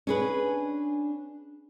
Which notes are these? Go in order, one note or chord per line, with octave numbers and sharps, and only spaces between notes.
C#4 D4 G#4 B4